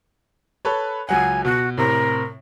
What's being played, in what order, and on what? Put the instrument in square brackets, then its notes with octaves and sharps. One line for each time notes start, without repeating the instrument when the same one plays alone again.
[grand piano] A4 B4 C#5
[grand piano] C#2 F#3 F#5 [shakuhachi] G#5
[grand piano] B2 [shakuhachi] F#4
[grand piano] A2 C3 C4 [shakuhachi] A#4